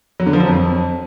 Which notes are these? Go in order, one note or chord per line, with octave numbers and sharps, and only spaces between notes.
F#3
D3
F3
F#3
F2